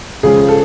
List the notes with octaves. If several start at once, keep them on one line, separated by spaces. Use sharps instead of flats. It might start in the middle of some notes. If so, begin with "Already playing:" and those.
C#2 C#3 F3 G#4
A4